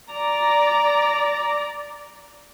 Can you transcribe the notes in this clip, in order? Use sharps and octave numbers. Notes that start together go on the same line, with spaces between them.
D5 A#5